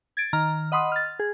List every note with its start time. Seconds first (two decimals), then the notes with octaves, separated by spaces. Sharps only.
0.17 G#6 A6 D7
0.33 D#3 A#5 F6
0.72 D#5 F#5 B5 C6 D#6
0.92 F6 A6
1.19 G#4